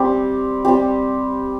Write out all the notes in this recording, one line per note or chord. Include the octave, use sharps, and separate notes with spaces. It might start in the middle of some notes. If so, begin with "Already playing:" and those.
Already playing: G3 C4 G4
G3 C4 G4